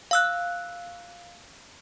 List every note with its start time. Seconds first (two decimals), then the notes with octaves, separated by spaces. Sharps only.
0.11 F5 E6 F#6